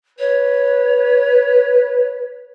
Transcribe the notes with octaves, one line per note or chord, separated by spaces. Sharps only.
B4 C#5